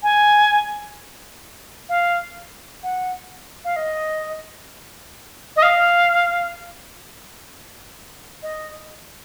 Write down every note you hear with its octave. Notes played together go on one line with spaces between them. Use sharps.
G#5
F5
F#5
F5
D#5
D#5
F5
D#5